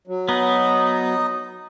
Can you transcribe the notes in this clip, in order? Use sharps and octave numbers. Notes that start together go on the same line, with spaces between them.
F#3
B3 D#4 D#5